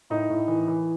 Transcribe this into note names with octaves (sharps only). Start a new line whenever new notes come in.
A2 D#4
A2
E3
E3